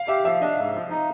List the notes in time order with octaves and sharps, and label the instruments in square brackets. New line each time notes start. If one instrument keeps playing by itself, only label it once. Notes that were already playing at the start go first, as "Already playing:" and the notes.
Already playing: [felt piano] F5
[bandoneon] G4 [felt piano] E5
[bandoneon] F3 [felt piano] E5
[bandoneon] D4 [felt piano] D#5
[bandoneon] G#2
F3
D#4